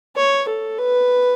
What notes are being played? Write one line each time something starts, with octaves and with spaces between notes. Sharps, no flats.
C#5
A4
B4